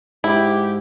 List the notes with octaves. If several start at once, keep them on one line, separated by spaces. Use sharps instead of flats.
G#2 E4 G4